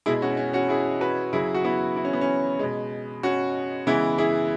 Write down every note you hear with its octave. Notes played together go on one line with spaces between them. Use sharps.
B2 G#3 E4 G#4
C#4 F#4
C#4
C#4 F#4
E4 G#4
F#4 B4
C#3 F#3 E4 G#4
F#4
B3 E4
E4
C#4
B3
C#4
B2 G#3
C#4 F#4
C#3 E3 G#3 B3 E4
E4 G#4